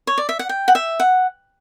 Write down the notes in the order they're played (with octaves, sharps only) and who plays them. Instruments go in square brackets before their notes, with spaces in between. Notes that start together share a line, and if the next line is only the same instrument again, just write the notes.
[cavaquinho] C#5
D5
E5
F#5
G5
F#5
E5
F#5